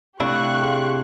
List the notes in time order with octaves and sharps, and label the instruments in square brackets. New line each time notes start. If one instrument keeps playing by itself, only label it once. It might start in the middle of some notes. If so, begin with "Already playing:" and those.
[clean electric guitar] C3 D4 E4 [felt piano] A3 [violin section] G4 C#6 F#6 [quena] F5
[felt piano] G#4 C6